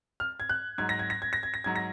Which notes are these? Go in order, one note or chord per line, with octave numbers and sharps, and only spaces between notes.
F6
G#6
F#6
G#2 F#3 G#6
A#6
G#6
A#6
G#6
A#6
G#6
A#6
G#2 F#3 G#6
A#6